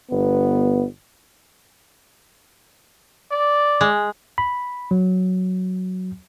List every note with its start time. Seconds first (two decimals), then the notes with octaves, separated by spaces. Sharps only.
0.11 G1 B3
3.31 D5
3.81 G#3
4.38 B5
4.91 F#3